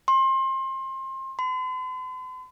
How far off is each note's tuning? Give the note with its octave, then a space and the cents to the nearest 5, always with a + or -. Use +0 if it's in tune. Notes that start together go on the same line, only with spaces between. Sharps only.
C6 +30
C6 -45